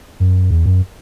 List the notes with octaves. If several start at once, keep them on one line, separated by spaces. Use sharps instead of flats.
F#2
E2
F#2